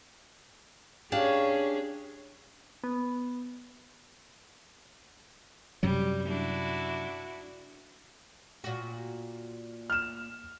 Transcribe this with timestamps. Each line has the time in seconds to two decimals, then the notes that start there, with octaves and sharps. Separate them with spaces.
1.12 C#4 D4 G4 G#4 F5
2.84 B3
5.83 F#2 C3 F#3 G3
6.27 D4 E4 F#4
8.64 A#2 F#4
9.90 F6 E7